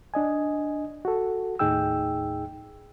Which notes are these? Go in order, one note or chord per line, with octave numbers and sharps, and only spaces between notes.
D4 D#5 G#5
F#4 A4
D#2 A2 D#4 G#4 G5 E6